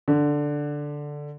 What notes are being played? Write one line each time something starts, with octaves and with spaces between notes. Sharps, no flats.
D3